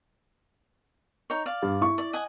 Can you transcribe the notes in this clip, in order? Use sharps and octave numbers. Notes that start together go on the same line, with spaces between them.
D#4 C#5
D5 F5
G2
E4 C#6
D5
D#5 F#5 G#5